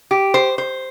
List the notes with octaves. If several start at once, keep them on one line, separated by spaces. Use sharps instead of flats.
G4
C5
C5